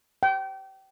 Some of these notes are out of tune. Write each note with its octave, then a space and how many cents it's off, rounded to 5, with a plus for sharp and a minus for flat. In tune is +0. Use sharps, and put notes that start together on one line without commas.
G5 -30